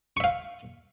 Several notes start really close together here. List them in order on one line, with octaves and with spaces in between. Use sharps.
C#6 E5 F5